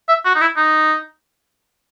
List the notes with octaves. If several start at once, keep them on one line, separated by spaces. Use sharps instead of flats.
E5
F#4
D#4
E4
D#4